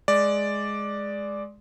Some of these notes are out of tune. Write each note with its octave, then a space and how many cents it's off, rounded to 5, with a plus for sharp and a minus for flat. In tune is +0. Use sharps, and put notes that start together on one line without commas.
G#3 +5 D5 +0